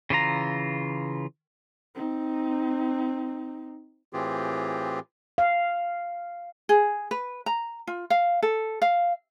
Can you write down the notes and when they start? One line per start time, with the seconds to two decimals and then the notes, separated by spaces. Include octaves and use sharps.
0.10 C#3 E3 F4 A#5
1.95 C4 D#4
4.13 A2 E3 C4 F4 G4 G#4
5.38 F5
6.69 G#4
7.11 B4
7.46 A#5
7.87 F4
8.10 F5
8.42 A4
8.82 F5